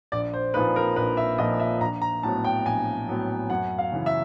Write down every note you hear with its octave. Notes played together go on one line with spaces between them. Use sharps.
A#1 D5
C5
A#2 F3 A#3 D#4 B4
A#4
A#1 B4
E5
A#2 F3 A#3 D#4 D#5
E5
A#1 A#5
A#5
A2 F#3 B3 A5
G5
A#1 G#5
A2 F#3 B3
F#2 F#5
F5
C#3 E3
E5